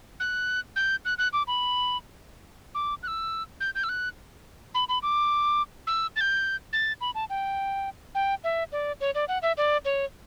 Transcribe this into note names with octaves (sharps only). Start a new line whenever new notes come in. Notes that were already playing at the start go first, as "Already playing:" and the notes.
F#6
G6
F#6
F#6
D6
B5
D6
F#6
E6
G6
G6
E6
F#6
B5
B5
D6
E6
A6
G6
A6
B5
A5
G5
G5
E5
D5
C#5
D5
F#5
E5
D5
C#5